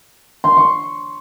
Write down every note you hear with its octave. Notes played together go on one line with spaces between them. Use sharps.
C6
C#6